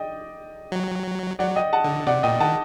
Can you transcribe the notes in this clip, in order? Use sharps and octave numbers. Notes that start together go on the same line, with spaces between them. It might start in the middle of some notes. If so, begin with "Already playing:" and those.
Already playing: D5 D#5 G5
F#3
F#3 D5 F#5
D#5 G5
F#5 A5
D3
C3 D5 F#5
A#2 D#5 G5
D#3 F#5 A5